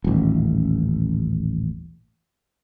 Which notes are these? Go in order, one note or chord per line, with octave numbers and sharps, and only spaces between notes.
D#1 A1